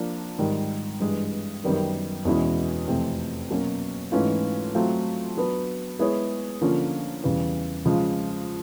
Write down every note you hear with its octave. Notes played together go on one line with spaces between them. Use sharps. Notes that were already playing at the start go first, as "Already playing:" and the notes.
Already playing: F3 A#3 D4
G#2 D#3 G3
G2 E3 G#3
F#2 D#3 G3 B3
E2 B2 G#3 C#4 E4
F2 C3 E3 A3 C4
B2 F#3 A#3 C#4 F#4
G#2 E3 A3 C#4 F4
F#3 A3 C4 F4
F#3 B3 D4
G#3 B3 E4 G#4 C#5
D3 F3 A#3 C#4 F4
E2 C#3 E3 G3
C#3 F3 G#3